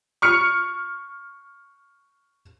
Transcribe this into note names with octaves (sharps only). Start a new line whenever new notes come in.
C#6 F6 C#7